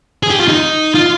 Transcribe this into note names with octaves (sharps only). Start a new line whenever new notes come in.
G#4
G4
F4
D#4
F4